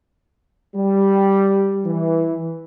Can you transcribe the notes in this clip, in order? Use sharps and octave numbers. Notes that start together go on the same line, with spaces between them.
G3
E3